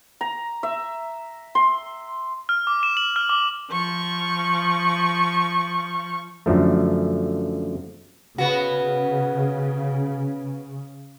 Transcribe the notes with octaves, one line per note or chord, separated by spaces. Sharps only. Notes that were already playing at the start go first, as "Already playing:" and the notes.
A#5
E5
C6
F6
D6
E7
F#7
F6
D6
F3 C#6
F#2 D3 F3 A3
C#3 B3 F#4